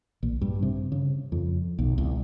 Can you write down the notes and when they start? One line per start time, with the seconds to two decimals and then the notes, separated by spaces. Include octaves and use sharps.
0.23 A#1
0.41 G2
0.63 C3
0.92 C#3
1.32 F2
1.79 B1
1.98 C2